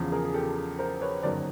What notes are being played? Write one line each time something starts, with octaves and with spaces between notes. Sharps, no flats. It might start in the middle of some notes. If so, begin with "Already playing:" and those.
Already playing: E2 C#3 F3
G#4 A#4
G#4
G4 A4
A#4 C5
B4 C#5
G1 F#2 D#3 F#3 A#3 C5 D5